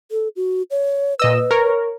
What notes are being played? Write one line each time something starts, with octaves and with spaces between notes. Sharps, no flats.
A4
F#4
C#5
A#2 B4 D#5 E6
A#4 C#5